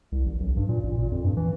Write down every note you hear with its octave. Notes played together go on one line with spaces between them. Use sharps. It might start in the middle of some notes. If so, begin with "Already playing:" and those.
C2
A1
B1
G2
A#2
A1
A#2
F2
G2
E3